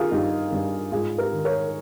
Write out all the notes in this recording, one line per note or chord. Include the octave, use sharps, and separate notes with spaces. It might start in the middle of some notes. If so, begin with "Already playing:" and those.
Already playing: D#3 F4 G4 G#4 A#4
G2 D#4 G4
G2
G#2 F4 G#4
G4 A#4
D#3
A#4 C#5